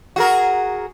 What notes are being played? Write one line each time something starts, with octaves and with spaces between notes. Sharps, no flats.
F#4 G#4 A#4